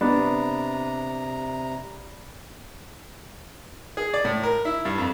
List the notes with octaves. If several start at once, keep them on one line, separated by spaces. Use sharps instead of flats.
C3 B3 D4 A#5
G#4
D5
A2
A#4
E4
G2
F2